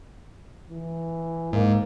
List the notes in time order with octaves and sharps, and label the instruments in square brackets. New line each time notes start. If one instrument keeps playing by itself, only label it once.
[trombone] E3
[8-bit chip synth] G#2 [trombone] A#3